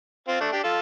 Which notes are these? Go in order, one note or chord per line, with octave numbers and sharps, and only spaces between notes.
C4 F4
A3 D4
D4 G4
F4 A4